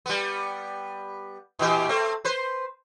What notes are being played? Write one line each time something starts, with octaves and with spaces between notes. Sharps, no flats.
G3 B3
A#2 E3 G4
A3 C4
B4 C5